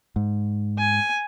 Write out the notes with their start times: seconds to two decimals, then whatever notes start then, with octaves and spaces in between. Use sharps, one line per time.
0.16 G#2
0.78 G#5